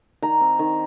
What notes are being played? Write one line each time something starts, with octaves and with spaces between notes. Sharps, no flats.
D#3 A#5
C4
D#3